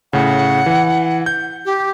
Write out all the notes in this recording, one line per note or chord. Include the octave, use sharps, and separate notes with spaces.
A2 C#3 F#5
E3
G6
G4